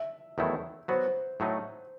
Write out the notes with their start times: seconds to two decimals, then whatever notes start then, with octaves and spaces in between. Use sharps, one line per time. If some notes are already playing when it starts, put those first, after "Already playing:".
Already playing: E5
0.38 E2 D#3 F#3 A3 E4
0.88 F#3 B3 F#4 C5
1.40 A2 F#3 A3 D#4